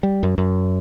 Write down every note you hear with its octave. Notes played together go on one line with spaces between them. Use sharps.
G3
F#2
F#2